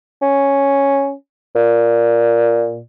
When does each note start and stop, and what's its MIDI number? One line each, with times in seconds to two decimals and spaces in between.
0.22 1.12 61
1.55 2.80 46